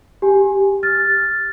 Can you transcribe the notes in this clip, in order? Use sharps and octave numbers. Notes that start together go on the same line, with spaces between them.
G4 G#5
F6 A6